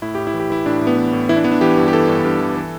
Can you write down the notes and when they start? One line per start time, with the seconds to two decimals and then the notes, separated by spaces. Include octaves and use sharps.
0.02 A2 E4
0.15 A2 G4
0.27 E4
0.34 E3
0.40 G4
0.50 E3 E4
0.66 A2 D4
0.81 A2
0.87 B3
0.97 E3
1.13 A2
1.29 E3 E4
1.36 D4
1.44 E3 B3
1.52 D4
1.61 E3 G4
1.77 G2
1.88 G4
1.93 E3 A4
2.09 G2
2.25 G2
2.41 E3
2.56 E3